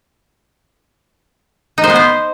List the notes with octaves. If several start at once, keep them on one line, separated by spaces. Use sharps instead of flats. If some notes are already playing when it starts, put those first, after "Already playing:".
D#4
C5
B3
C5